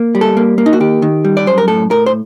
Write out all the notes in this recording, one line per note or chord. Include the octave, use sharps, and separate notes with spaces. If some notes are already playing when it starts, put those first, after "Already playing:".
Already playing: A#3
G3
A4
A#3
A#3
D#4
F#4
D#3 G4
D#3
G3
D5
F#2 C5
A#4
A2 A4
A2 A#4
C5